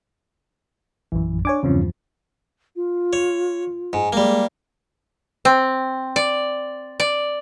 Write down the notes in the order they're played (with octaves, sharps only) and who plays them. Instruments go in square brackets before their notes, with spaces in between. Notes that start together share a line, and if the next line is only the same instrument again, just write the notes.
[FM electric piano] A#1 F#2 [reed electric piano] E3
[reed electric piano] D4 [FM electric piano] C#5 G#5 D6
[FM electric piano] E2 G2 F3 [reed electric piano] C#3 C4 C#4
[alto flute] F4
[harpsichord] C#5
G#2
[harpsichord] G3 A#3 [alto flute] G#3
[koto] C4
D5
D5